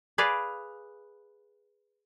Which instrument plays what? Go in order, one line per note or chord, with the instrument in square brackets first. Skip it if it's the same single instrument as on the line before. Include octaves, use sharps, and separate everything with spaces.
[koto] G#4 B4 D5 F5